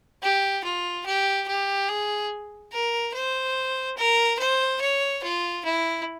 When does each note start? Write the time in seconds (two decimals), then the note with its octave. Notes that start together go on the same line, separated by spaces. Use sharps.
0.22 G4
0.64 F4
1.06 G4
1.48 G4
1.88 G#4
2.72 A#4
3.14 C5
3.97 A#4
4.39 C5
4.81 C#5
5.23 F4
5.65 E4